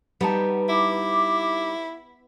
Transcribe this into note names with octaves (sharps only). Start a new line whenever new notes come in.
G3 B3 D#4 A5
E4 D6